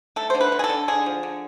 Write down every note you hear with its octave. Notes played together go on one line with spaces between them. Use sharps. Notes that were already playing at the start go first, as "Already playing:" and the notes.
A3 A4
D3 C5
B4
D3
G#4
A4
D3
D3 G#4
F3
D3